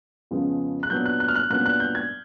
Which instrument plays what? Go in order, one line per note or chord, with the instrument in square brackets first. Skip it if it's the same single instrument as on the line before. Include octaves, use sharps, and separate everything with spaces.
[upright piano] F2 C#3 F3 G#3 B3
F#6
A#2 F#3 B3 D4 G6
F#6
F#6
F6
F#6
A#2 F#3 B3 D4 F#6
F#6
G6
G#6